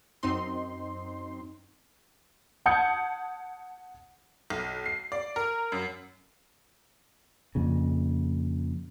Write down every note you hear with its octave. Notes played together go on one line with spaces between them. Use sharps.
F#2 C4 D#4 C6
F#5 A5 D#6 G6 G#6 C#7
B1
C7
D5
A#4
F#2
F2 A#2 C#3